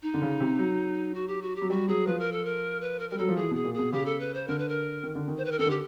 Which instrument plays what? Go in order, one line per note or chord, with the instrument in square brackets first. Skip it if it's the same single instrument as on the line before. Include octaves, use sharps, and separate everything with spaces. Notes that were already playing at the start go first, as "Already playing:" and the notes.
[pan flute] D#4
[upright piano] D3
C#3
C3
F#3
[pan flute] F#4
G4
F#4
G4
[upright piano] F#3
[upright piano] G3 [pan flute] F#4
[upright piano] F#3 [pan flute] G#4
[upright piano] F3 [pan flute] B4
[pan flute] A#4
A4
A#4
B4
A#4
[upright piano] G3 [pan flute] A#4
[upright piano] F#3 [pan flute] A4
[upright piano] F3
[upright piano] E3 [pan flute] G#4
[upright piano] B2 [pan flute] G#4
[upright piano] A#2
[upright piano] B2 [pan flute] G#4
[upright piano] C#3 [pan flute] G4
[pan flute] A4
B4
C5
[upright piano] D3 [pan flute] A#4
[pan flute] B4
A#4
[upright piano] D#3
D3
D#3
[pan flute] C5
B4
A#4
[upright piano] D#3 [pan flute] A4
[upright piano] D3
[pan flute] G4